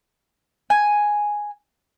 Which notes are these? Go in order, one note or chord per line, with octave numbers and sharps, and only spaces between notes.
G#5